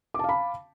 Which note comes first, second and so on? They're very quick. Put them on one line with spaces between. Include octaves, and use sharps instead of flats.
D6 A5 F5 B5